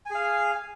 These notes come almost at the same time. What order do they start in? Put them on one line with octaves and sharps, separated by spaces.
G#5 G#4 F5